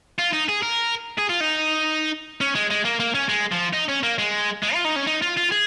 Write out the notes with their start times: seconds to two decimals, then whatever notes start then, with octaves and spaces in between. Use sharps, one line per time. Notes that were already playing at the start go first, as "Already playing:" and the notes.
0.18 F4
0.33 D#4
0.49 G#4
0.63 A#4
1.18 G#4
1.29 F4
1.41 D#4
2.41 C#4
2.55 G#3
2.71 G#3
2.85 A#3
3.00 A#3
3.15 C#4
3.29 G#3
3.52 F3
3.73 D#4
3.88 C#4
4.03 A#3
4.18 G#3
4.63 G#3
4.74 F4
4.84 D#4
4.96 C#4
5.07 D#4
5.22 F4
5.37 F4
5.51 G#4